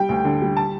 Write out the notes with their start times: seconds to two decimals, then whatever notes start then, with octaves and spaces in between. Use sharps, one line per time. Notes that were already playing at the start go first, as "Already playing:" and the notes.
Already playing: G3 G5
0.09 D2
0.25 D3
0.41 G3
0.57 A5